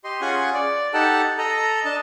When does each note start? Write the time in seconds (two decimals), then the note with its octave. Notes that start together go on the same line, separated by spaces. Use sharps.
0.04 G4 D#5 C6
0.21 C#4 F4 G#4 F#5 G#5 C#6
0.54 D5
0.94 D#4 G4 A4 F#5 A5
1.38 A4 D#5 A#5
1.85 D4 D#5 A5